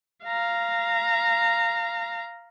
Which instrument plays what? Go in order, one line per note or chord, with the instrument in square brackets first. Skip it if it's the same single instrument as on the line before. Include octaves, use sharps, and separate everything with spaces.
[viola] F5 A#5